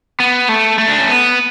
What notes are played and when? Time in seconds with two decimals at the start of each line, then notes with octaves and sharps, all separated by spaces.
0.20 B3
0.49 A3
0.79 A3
0.88 D4
0.98 C#4
1.08 B3